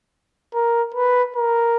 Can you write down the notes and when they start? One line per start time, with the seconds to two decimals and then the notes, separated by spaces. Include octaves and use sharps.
0.54 A#4
0.94 B4
1.36 A#4